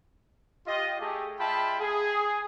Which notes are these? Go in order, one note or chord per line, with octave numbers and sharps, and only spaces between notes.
F4 G4 D#5
A3 G4 G#4
G#3 F4 E5 G5 A5 B5
G#4